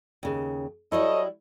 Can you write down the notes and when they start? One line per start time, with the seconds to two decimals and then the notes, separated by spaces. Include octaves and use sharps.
0.23 D#2 C#3
0.92 F#3 G3 E4 A4 C#5 D#5